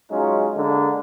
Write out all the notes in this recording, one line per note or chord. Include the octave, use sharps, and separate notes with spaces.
F#3 G#3 C#4 D#4 F4
D3 G#3 A#3 D4